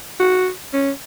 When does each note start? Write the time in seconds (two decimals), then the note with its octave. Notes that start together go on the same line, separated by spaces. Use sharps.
0.20 F#4
0.73 C#4